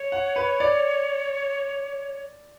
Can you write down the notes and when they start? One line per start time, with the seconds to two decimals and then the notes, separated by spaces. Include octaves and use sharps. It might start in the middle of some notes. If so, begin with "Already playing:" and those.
Already playing: C#5
0.12 F#5
0.36 B4
0.60 D5